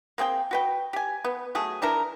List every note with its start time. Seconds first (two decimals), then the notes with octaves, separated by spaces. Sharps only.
0.18 A#3 C4 G#4 G5
0.51 F#4 B4 G5
0.93 G4 G#5
1.25 B3
1.55 F#3 A3 G#4
1.82 E3 D4 E4 A#4